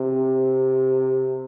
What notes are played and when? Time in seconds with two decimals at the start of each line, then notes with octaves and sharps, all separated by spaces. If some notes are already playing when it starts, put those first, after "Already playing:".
Already playing: C3